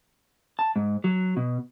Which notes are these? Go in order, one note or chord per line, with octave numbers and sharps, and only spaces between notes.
A5
G#2
F#3
B2